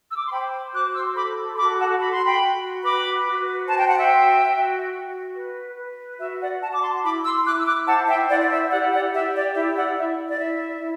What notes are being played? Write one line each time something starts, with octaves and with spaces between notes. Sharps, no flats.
E6
D6
C6
C5 G5 B5
F#4 D6 F#6
C6 E6
A4 B5 D6
C6
F#4 B5 D6
F#5 A5
F#4 B5
C6
G5 B5
F#4
B4 B5 D6
F#4
C5 A5
G5
F#5
E5 G5
F#4
F#4
F#4
B4
B4
F#4 E5
D5 F#5
F#4 F#5 A5
D6
A5 C6
E4 B5 D6
C6 E6
E4 D6 F#6
E6
D6 F#6
C5 F#5 A5
E5 G5
E4 D5 F#5
D5
E5
G4 D5 F#5
D5 F#5
G4 E5
D5
E4 E5
D5 F#5
E4 E5
D5
E4 E5
E4